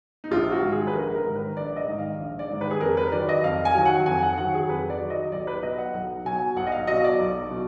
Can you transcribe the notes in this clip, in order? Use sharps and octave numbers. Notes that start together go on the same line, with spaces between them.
D#4
A#1 F4
F#4
G#2 D#3
G#4
B4
A#1 A#4
A#4
G#2 D#3
B4
A#1 D5
D#5
G#2 D#3
F5
A#1
D5
G#2 D#3
B4
G#4
F2 A#4
B4
D#3 F#3 D5
D#5
F2 F5
G#5
D#3 F#3
F#5
F2 G#5
F#5
D#3 F#3 F#5
G#4
F2 B4
D5
D#3 F#3
D#5
B1 D5
B4
B2 F#3 D#5
F#5
B1 F#5
B2 F#3 G#5
B1 F#5
D#5
F5
B2 F#3 D#5
D5
B1
B2